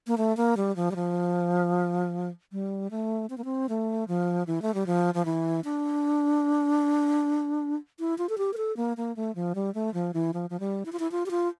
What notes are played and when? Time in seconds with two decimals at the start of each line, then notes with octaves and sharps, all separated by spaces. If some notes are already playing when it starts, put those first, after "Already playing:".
0.07 A#3
0.18 A3
0.37 A#3
0.57 G3
0.76 F3
0.91 G3
0.96 F3
2.52 G3
2.91 A3
3.30 C4
3.38 A#3
3.45 C4
3.69 A3
4.08 F3
4.47 E3
4.62 A3
4.74 G3
4.86 F3
5.14 F3
5.25 E3
5.64 D4
7.99 E4
8.18 F4
8.29 A4
8.38 G4
8.53 A#4
8.57 A4
8.77 A#3
8.97 A#3
9.16 A3
9.35 F3
9.55 G3
9.75 A3
9.94 F3
10.14 E3
10.34 F3
10.50 F3
10.60 G3
10.86 E4
10.92 F4
10.99 E4
11.12 F4
11.26 G4
11.31 F4